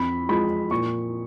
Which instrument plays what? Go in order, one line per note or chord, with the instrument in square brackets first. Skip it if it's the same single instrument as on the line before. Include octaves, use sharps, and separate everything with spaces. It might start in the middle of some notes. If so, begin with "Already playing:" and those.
Already playing: [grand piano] F2 B5
F3 G#3 B5
A#2 C#6